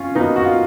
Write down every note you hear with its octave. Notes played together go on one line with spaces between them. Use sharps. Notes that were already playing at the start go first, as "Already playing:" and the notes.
Already playing: C#4 F4
B2 A#3 B3 D#4
F#4
F4